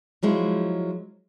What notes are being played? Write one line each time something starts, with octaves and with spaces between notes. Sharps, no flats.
F3 F#3 G#3 E4